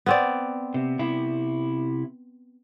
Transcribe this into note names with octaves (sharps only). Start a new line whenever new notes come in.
B3 C4 D5
C3
C3 E4